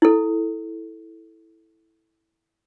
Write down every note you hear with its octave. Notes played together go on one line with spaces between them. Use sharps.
E4 A4